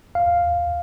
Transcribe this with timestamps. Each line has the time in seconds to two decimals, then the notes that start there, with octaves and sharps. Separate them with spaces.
0.15 F5